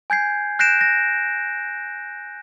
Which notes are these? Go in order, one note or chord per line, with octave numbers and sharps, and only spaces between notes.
G#5 G6 G#6 C7
F#6 G6 A#6 C7 D7 E7
A#6